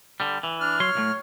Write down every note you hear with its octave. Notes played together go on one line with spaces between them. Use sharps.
D3 G3
E3
D4 F6
F#3 C#5 C6
B1 A2 A3